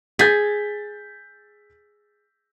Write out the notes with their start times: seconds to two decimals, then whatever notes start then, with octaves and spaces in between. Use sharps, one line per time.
0.19 G#4 G6 A6 B6